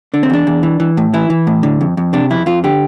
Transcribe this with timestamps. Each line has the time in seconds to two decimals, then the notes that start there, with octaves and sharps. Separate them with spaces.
0.14 D3 D4
0.23 C4
0.30 E2 D4
0.47 E2
0.63 E3
0.80 E3
0.97 A2
1.14 E3 E4
1.30 E3
1.47 A2
1.63 D3
1.81 F2
1.97 F2
2.13 C3 D4
2.30 F2 E4
2.46 F2 F4
2.64 D3 G4